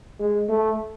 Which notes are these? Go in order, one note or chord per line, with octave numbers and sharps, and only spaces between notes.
G#3
A3